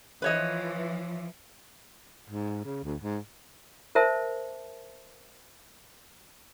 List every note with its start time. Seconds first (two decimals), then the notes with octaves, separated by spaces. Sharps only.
0.22 E3 F3 B4 C#5 D#5
2.30 G#2
2.65 C#3
2.84 D2
3.02 G#2
3.95 A#4 C5 E5 A5